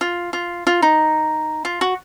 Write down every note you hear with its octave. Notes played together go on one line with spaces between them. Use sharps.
F4
F4
F4
D#4
F4
F#4